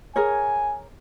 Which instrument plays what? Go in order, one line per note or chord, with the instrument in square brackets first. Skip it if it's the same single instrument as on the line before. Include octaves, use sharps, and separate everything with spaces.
[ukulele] G#4 A#4 C#5 [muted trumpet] G#5